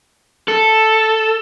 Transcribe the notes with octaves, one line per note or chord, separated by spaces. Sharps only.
A4